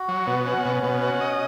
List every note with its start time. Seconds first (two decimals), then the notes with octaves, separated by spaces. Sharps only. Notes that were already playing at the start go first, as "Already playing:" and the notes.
Already playing: F#4
0.08 F#3
0.27 B2
0.45 C#4 F#4
0.65 B2
0.84 B2
1.02 F#4
1.20 D#5